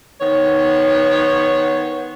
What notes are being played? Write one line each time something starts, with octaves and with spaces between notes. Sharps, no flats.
D#3 B3 C5 C#5